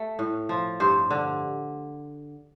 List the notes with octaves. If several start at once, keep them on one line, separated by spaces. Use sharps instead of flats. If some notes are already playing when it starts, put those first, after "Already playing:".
Already playing: A3
A2
F3
G2 C5
D3